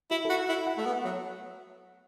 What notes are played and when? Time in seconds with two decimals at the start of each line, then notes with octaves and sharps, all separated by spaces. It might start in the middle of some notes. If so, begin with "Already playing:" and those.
0.11 E4 F#4
0.25 A4
0.30 F#4
0.49 E4
0.53 E5
0.67 F#5
0.78 A3 E5
0.86 B3
0.93 F#5
1.05 F#3